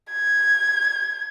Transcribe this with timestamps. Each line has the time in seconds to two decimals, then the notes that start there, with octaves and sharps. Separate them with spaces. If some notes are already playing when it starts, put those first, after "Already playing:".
0.12 G#6